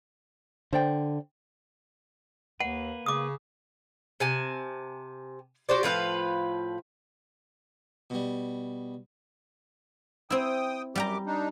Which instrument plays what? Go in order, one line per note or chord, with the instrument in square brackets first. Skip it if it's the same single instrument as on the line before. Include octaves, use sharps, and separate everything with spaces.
[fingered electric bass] D3 [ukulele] C5 D5 G5
[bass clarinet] D#2 [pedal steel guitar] A#3 B4 [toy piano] F#5
[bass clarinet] C#3 [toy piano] D6 D#6
[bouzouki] C3 G#5 A5
F#4 G4 C5 D5
A2 F3 B4 F5
[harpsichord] B2 G3
[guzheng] C4 E4 [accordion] G5 D#6
[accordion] F#2 G4 D6 [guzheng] G3 G5 A#5
[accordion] D4 D#4